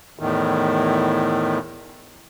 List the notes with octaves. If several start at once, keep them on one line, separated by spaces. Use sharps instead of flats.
E2 A2 D#3